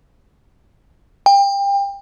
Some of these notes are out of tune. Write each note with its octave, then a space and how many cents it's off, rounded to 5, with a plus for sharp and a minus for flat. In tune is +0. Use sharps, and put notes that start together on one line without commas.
G5 +30